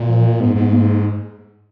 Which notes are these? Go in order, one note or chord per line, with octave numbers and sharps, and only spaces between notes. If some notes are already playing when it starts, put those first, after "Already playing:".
Already playing: A#2
F3
G#2 B3
G#2 B3
A#3